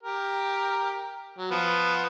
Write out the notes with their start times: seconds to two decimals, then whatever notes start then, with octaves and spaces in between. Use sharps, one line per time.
0.03 G4 A#4
1.38 F#3
1.51 F3 B3